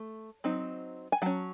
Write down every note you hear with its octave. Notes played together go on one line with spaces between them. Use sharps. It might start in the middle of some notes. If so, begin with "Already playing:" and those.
Already playing: A3
F#3 C4 D#4
G#5
F#3 C#4 F#5 A5